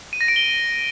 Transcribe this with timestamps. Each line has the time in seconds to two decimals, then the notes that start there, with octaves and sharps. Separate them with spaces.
0.13 D#7
0.21 A#6
0.28 D7
0.36 G7